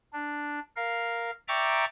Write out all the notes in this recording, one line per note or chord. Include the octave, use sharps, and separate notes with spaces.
D4
A#4 F5
D5 E5 G5 A#5 C#6 D6